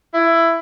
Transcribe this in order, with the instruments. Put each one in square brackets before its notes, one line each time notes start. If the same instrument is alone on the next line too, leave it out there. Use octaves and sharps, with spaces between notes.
[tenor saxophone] E4